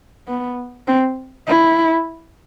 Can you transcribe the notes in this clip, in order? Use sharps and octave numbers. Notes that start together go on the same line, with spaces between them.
B3
C4
E4